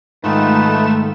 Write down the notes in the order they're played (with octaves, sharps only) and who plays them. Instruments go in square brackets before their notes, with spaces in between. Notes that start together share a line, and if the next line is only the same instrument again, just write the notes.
[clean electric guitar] G#2 D#3 [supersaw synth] A3 E7 [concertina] D#4 F4 B4